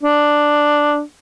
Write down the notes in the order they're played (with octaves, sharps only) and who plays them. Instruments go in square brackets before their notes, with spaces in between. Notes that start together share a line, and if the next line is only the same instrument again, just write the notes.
[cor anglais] D4